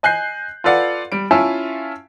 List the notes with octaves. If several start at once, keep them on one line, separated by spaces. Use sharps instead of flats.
D#5 G#5 F#6 G6 C7
F4 A4 B4 D5 F5 F#5
G3 D7
C#4 E4 F4 E5 G#5 A5